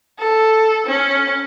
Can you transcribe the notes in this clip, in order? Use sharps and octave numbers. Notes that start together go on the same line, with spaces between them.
A4
C#4